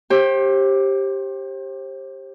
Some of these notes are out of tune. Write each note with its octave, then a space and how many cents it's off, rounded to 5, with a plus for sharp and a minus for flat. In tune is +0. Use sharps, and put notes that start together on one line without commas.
G4 +0 C5 +35